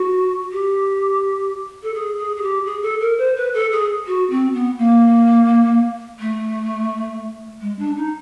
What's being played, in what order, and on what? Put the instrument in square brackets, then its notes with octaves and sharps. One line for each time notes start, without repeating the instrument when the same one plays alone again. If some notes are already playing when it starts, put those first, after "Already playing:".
Already playing: [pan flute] F#4
G4
A4
G#4
G#4
G#4
G4
G#4
A4
A#4
C5
B4
A4
G#4
F#4
C4
B3
A#3
A3
G#3
D4
D#4